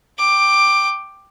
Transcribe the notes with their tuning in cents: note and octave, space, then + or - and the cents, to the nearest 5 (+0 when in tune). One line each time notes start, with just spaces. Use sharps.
G5 +0 D6 +10